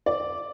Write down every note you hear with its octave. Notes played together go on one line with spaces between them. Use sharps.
D5